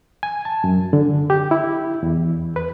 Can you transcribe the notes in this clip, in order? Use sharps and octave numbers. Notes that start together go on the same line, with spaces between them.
G#5
A5
F#2
D3
G4
E4
E2
B4